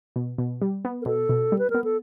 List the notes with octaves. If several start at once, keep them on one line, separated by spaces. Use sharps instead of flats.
B2
B2
G3
B3
A#4
B2 A4
B2
G3
B4
B3 A#4
A4